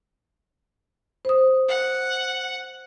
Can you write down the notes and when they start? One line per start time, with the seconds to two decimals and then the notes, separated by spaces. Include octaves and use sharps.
1.25 C5 D#6
1.68 F#5